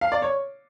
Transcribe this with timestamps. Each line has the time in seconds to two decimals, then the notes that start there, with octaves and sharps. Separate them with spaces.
0.01 F5
0.12 D5
0.22 C#5